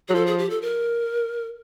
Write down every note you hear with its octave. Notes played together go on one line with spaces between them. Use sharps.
F#3 G#4
F3 A4
G#4
G4
A4
A#4